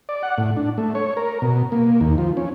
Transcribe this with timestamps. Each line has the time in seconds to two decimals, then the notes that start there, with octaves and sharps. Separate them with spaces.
0.09 D5
0.23 F#5
0.38 A2
0.57 D4
0.78 A3
0.95 C#5
1.17 A#4
1.42 B2
1.72 A#3
2.01 D#2
2.18 F3
2.37 C#4